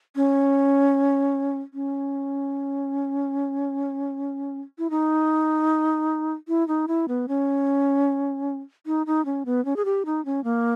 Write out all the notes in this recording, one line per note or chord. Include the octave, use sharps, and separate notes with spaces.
C#4
C#4
E4
D#4
E4
D#4
E4
B3
C#4
D#4
D#4
C#4
B3
C#4
G#4
G4
D#4
C#4
A#3